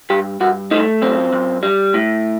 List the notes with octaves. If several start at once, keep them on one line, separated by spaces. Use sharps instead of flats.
G2 G4
G2 F#4
A3 D#4
F#2 C4
F#2
G3
A2